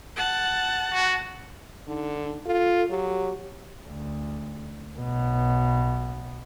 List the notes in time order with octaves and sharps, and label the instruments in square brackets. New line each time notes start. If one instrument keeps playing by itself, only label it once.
[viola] F#5 A5
[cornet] F#4
[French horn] D3 [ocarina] D#4
[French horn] F4 [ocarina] A4
[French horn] F#3 [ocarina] G4
[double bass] D2
B1 B2